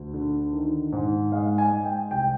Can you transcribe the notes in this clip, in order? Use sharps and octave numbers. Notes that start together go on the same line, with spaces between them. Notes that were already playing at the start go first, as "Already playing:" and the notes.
Already playing: D2
D3
D#3
G#2
G#3 F5
G#5
G#3
G5
C2 G5